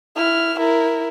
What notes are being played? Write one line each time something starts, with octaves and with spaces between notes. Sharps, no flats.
E4 F6
E4 A#4